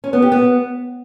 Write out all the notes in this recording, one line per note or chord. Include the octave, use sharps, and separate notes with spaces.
C#4
B3
G4
B3